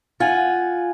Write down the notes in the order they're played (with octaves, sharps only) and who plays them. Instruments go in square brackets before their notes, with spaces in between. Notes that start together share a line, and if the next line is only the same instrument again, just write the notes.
[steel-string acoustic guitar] F4 F#5 G#5